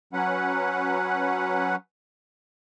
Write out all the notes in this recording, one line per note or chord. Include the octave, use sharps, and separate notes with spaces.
F#3 C#4 B4 F#5